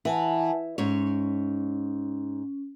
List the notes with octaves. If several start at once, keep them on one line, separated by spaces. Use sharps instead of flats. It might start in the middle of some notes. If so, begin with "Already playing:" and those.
E3 F#5 G#5 A5
G#2 C#4 C#5